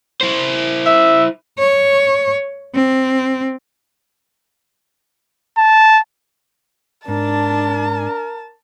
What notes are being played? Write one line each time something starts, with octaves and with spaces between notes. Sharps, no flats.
E4 C5
E5
C#5
C4
A5
G#2 D4 A#4 A5